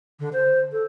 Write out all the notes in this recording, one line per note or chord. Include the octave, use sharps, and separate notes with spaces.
D3
C5
A4